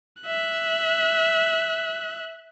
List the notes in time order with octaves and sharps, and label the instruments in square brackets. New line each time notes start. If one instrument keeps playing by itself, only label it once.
[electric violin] E5 F#6